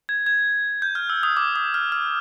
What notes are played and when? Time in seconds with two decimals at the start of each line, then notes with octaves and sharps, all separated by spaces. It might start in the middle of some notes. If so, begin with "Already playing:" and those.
0.09 G#6
0.26 G#6
0.82 G6
0.95 F6
1.10 E6
1.23 D#6
1.37 D6
1.56 D#6
1.74 F6
1.92 F6